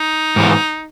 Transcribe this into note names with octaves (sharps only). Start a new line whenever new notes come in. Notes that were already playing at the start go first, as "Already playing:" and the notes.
Already playing: D#4
G#2 E3 G#3